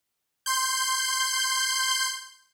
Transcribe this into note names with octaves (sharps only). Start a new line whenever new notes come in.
C6 G6